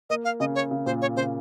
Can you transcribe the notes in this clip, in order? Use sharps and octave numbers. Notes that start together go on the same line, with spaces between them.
A#3 D#5
F5
C#3 D#5
C#5
C#3
A#2 C5
C#5
C#3 C5